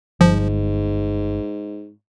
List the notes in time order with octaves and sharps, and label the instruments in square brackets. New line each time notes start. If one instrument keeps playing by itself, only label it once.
[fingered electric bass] G1 [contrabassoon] G#2 [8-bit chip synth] F3